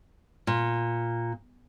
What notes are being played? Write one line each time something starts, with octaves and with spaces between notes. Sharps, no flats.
A#2